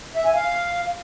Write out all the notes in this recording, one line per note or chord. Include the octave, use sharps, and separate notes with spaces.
E5
G#5
F5